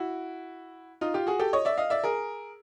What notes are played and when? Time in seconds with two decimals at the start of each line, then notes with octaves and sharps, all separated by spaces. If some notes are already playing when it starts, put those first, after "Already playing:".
Already playing: E4 F#4
1.01 D#4 F4
1.14 F4 G4
1.27 F#4 G#4
1.39 G4 A4
1.53 C#5 D#5
1.65 D5 E5
1.78 D#5 F5
1.90 D5 E5
2.04 G#4 A#4